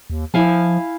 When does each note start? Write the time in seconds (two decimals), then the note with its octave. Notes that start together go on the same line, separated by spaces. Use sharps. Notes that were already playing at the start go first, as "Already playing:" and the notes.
0.10 D#2
0.34 F3 E4 F5 G#5